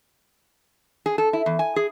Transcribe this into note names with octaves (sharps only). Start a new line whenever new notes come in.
G#4
A4
E4
E2
G#5
G#4